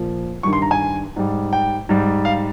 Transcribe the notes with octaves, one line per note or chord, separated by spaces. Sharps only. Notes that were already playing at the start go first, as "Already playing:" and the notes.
Already playing: A#2 F3
G2 D#3 G3 C#6
C6
A#5
G#5
G#2 G3
G5
G#2 G3
F5